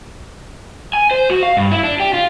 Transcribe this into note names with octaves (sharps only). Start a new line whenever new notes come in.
G#5
C5
F#4
F5
G2
E4
D4
G4
F4